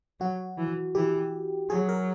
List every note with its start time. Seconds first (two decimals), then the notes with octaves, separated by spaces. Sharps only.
0.20 F#3 F#4
0.58 E3
0.95 E3 G4
1.69 F#3 G#4
1.89 A#4